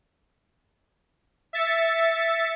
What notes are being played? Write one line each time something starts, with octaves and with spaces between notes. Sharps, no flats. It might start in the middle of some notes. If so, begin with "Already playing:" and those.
E5 A6 C#7